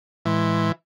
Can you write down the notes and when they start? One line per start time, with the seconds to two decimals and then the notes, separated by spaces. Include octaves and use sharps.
0.25 A2 E3 G#3 C6